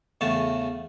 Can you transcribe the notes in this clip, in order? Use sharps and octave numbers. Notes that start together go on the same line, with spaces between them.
E2 C#3 A3 A5